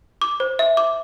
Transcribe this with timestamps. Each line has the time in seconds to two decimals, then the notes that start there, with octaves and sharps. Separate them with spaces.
0.22 D6
0.40 C5
0.59 E5
0.77 D6